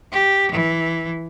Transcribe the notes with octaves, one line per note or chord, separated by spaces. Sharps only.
G4
E3